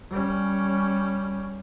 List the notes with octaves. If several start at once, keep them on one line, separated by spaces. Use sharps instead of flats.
G3 C#4